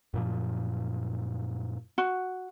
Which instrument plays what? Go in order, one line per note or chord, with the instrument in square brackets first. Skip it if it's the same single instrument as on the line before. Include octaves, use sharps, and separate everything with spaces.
[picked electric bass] F#2 A#2 F3
[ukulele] F#4